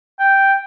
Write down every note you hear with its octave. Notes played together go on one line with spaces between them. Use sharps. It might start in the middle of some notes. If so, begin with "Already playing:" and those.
G5